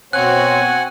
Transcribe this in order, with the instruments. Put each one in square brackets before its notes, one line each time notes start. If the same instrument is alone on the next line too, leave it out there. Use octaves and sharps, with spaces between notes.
[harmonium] B2 C5 C#5 [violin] C4 F#4 [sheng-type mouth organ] F#5 G#5 [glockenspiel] F#6